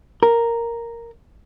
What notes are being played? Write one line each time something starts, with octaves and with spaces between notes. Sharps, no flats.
A#4